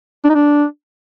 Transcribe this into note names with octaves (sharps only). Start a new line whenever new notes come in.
D4
D#4
D4